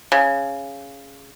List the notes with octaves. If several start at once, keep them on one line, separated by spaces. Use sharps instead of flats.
C#3